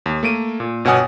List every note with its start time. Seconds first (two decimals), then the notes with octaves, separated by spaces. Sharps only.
0.06 D#2
0.23 A3 A#3 D7 D#7
0.60 A#2
0.85 G1 B2 C#5 F#5 G#5 D#6